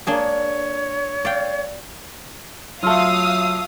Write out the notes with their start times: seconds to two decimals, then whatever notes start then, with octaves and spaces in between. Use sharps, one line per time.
0.07 A#3 D4 G#4 C#5
1.25 D5 F5 G5
2.83 F#3 A3 F4 F5 D#6 E6